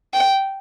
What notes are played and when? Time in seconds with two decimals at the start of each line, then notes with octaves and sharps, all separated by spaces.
0.14 G5